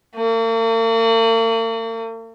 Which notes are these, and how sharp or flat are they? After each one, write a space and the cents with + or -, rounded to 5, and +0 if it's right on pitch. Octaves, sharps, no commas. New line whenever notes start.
A#3 -45